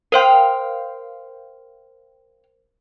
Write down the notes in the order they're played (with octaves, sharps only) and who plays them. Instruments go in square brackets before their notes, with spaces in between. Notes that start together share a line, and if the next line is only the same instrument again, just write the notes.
[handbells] A#4 C5 C6 [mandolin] F5 G5